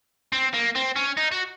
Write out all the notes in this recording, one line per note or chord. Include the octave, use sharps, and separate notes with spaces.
C4
A#3
C4
C#4
D#4
F#4